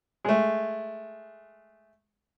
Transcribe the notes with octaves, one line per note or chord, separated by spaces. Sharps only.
G#3 A3